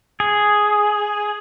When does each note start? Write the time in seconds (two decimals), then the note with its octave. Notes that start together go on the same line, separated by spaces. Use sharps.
0.20 G#4